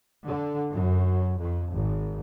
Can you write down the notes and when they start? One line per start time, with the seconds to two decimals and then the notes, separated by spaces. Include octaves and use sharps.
0.25 D3
0.72 F#2
1.39 F2
1.71 G#1